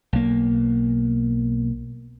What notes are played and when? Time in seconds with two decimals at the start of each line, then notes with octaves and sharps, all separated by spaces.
0.13 B1 A#3